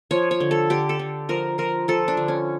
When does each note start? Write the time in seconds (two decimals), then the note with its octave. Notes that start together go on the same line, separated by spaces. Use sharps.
0.11 F3 C#5
0.31 C#5
0.40 D3
0.51 A4
0.70 D3 G4
0.89 A4
0.99 D3
1.29 F3 A#4
1.58 F3 A#4
1.88 F3 A4
2.08 D4
2.17 D3
2.28 C#4